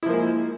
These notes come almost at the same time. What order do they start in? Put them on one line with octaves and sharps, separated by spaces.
E4 F3 A#3 G#3